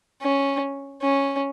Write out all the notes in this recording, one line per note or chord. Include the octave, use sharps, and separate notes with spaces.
C#4
C#4